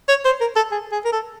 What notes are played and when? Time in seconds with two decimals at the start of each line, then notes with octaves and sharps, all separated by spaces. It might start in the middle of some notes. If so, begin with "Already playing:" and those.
0.09 C#5
0.25 C5
0.41 A#4
0.56 A4
0.72 G#4
0.92 G#4
1.05 A#4
1.13 A4